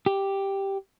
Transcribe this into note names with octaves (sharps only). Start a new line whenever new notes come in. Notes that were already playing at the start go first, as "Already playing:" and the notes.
G4